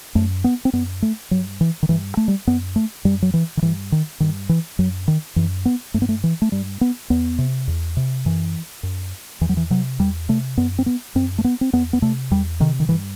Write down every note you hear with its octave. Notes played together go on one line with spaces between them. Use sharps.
F#2 A3
B3
C4
F#2 B3
A3
G2 F#3
E3
D#3
G2 E3
A3
G3
F#2 B3
A3
F#2 G3
F#3
E3
D#3
G2 E3
D#3
G2 D#3
E3
F#2 F#3
D#3
F#2 E3
B3
G2 A3
B3
A3
E3
A3
G2 G3
B3
E2 B3
C3
E2
C3
F#2 E3
F#2
E2 E3
F#3
E3
C3 F#3
E2 G3
C3 A3
F#2 B3
C4
B3
F#2 C4
A3
B3
C4
E2 B3
B3
C3 A3
E2 G3
C3 D#3
D#3
G2 E3